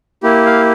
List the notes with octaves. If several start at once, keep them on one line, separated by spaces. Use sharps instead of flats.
A#3 E4 G4
F5